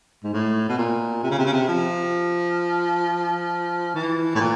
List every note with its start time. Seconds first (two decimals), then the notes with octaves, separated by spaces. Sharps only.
0.24 G#2
0.33 A2
0.69 B2
0.78 A#2
1.23 C3
1.31 C#3
1.39 C3
1.45 C#3
1.53 C3
1.68 F3
3.95 E3
4.35 A2
4.40 A#2